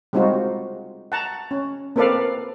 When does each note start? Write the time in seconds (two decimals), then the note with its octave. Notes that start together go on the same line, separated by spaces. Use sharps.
0.13 G3 G#3 C4 D#4 F4 F#4
1.12 F#5 A5 A#5
1.51 C#4
1.96 A#3 C4 A4 B4 D5 F5